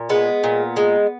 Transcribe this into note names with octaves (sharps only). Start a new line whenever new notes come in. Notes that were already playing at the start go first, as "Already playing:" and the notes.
Already playing: A#2
G#3 B3
A#2
G#3